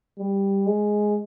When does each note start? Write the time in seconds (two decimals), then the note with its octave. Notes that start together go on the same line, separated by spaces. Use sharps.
0.18 G3
0.66 G#3